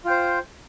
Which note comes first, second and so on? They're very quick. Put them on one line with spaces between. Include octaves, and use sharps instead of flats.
F4 G5 C5